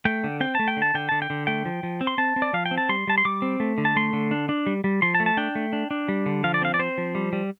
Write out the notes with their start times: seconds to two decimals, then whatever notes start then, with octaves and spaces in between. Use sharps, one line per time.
0.05 A3 G5
0.24 D3
0.40 C4 G5
0.55 A3 A5
0.68 G5
0.77 D3
0.82 A5
0.94 D3 G5
1.09 D3 A5
1.22 G5
1.30 D3
1.47 A3 G5
1.65 F3
1.83 F3
2.01 C4
2.07 C6
2.18 C4 A5
2.36 C4
2.42 D5
2.53 F3 F5
2.66 G5
2.71 C4
2.78 A5
2.89 G3 C6
3.07 G3 A5
3.18 C6
3.25 G3 D6
3.42 C4
3.60 A3
3.78 D3
3.85 A5
3.96 A3 C6
4.13 D3
4.31 D4
4.49 D4
4.67 G3
4.84 G3
5.02 F3 C6
5.15 A5
5.20 A3
5.26 A5
5.37 D4 G5
5.55 A3
5.73 D4
5.91 D4
6.08 G3
6.26 D3
6.44 F3 F5
6.54 D5
6.62 C4 F5
6.74 D5
6.79 C4 C5
6.98 F3
7.15 G3
7.33 G3